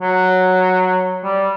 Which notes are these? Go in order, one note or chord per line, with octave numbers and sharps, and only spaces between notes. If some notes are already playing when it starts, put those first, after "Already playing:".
F#3
G3